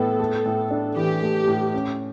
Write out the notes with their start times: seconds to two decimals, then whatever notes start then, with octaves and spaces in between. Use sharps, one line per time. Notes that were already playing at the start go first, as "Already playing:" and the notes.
Already playing: A2 B3 A4
0.20 A3
0.46 A2
0.71 D4
0.96 E3 G4
1.23 A3
1.47 A2
1.74 C#4